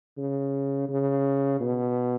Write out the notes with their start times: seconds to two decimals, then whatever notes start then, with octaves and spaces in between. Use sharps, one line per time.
0.18 C#3
0.89 C#3
1.61 B2